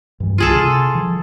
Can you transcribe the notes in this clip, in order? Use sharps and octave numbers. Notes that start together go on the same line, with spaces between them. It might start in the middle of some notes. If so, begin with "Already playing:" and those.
G2 E3
C2 F4 G#4 A4
C3
E3 F3